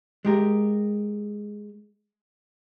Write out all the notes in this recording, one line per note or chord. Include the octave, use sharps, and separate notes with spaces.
G#3 G4 A#4